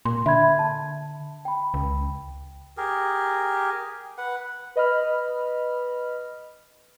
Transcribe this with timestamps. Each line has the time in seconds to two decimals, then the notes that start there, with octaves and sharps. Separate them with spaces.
0.05 A#2 C6
0.26 D3 E5 B5 G#6
0.59 A5
1.45 G5 B5
1.74 C#2
2.77 G4 G#4 A#4
4.18 B4 F#5
4.76 B4 D#5 B5 F6